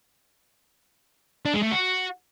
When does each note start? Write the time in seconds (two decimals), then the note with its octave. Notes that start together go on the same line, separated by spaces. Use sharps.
1.45 D4
1.54 G#3
1.63 A3
1.71 F#4